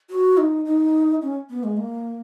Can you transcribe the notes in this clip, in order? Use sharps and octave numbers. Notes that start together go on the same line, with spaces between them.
F#4
D#4
D#4
C#4
B3
G#3
A#3